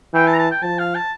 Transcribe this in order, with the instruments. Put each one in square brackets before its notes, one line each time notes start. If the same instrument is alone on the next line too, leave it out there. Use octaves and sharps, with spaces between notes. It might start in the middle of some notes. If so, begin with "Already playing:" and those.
[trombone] E3 [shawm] G5
[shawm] A5
A#5
A5
G5
[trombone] F3 [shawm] A5
[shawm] F5
A5